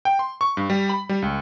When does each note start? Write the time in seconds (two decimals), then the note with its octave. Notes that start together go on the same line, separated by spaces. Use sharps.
0.05 G5
0.19 C6
0.41 C#6
0.57 G2
0.70 G3
0.89 B5
1.09 G3
1.22 C#2